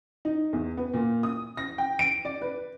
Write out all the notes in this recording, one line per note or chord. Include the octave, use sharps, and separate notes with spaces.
D#4
E2
B3
A#2
D#6
A#6
G5
D7
D5
B4